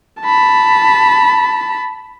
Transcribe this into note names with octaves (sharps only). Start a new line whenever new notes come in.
A5 B5